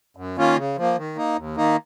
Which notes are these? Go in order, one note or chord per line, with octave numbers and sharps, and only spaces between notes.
F#2
D#3 A#3 C#4 F4
C#3
F3 A#3
D#3
A#3 D#4
D#2
D#3 A#3 D#4